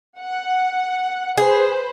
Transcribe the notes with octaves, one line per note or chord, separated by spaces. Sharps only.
F#5
G#4 B4 C5